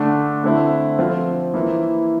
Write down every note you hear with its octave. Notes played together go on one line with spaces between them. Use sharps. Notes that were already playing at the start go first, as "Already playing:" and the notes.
Already playing: D3 A3 D4
D3 A3 C4 E4
F3 C4 F4
E3 A#3 E4